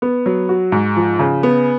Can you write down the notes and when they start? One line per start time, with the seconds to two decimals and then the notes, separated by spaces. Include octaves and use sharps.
0.02 B3
0.26 F#3
0.49 F#4
0.72 G#2
0.96 F3
1.19 C#3
1.43 B3